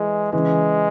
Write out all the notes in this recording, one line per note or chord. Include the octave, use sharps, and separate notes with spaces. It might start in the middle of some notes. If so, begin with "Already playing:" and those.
Already playing: E3 G#3
C#3 E3 G#3